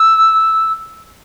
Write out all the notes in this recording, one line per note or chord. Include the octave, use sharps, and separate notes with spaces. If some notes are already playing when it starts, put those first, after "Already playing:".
Already playing: E6